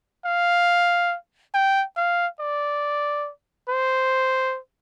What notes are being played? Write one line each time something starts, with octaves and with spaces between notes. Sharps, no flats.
F5
G5
F5
D5
C5